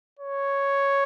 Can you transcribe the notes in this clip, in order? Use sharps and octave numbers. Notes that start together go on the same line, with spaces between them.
C#5